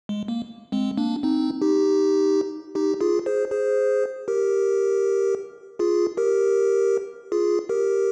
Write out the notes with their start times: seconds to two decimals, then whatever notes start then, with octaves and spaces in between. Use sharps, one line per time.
0.09 G#3
0.28 A#3
0.72 G#3 C4
0.98 A#3 D4
1.23 C4 D#4
1.62 D#4 G4
2.75 D#4 G4
3.01 F4 G#4
3.26 G#4 C5
3.51 G#4 C5
4.28 G4 A#4
5.79 F4 G#4
6.17 G4 A#4
7.32 F4 G#4
7.69 G4 A#4